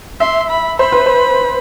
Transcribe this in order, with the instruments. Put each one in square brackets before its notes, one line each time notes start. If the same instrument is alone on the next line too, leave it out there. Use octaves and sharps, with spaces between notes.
[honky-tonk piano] E5 [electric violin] C6
[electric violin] B5
[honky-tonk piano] C5 [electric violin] B5
[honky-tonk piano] B4
C5